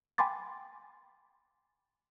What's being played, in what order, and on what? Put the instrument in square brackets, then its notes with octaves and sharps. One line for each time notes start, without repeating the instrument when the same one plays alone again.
[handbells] G5 G#5 B5 C6 D6 A6